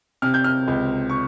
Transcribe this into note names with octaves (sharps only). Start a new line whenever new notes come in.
C3 F6
G6
F6
C#2
C#6